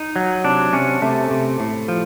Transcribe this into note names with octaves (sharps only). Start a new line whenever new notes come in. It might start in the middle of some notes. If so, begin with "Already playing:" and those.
Already playing: D#4
F#3
C3 D4
C3 C#4
C3 A3
C3
A2
F3